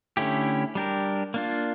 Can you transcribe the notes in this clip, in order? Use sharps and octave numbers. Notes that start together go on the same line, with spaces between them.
D3 A3 C#4 E4 G4
G3 D4 G4 A#4
A#3 D4 F4